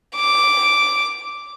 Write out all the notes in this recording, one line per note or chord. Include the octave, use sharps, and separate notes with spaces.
D6